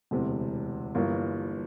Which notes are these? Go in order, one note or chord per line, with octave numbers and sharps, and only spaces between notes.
E1 D2 C3 E3
G1 G2 E3 A#3 F4